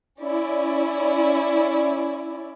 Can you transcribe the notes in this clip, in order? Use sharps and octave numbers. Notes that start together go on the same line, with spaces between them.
C#4 E4 D5